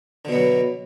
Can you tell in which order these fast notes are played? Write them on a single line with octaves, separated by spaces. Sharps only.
D3 B2 B3 F#3